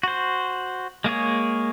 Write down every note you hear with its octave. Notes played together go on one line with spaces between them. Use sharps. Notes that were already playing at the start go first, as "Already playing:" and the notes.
F#4 C5
G#3 A#3 G#4 C#5